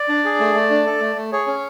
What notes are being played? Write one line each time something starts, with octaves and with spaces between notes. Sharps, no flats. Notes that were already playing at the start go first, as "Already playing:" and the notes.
Already playing: D5
D4
G#4
A3
A3
D4
A4
A3
A3
G#4 C#5
C#4